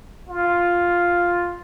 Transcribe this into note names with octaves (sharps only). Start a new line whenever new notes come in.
F4